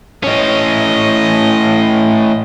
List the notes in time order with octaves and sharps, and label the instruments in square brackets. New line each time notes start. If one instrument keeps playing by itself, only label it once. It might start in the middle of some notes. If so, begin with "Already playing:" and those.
[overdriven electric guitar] A2 C#4 [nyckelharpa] D#5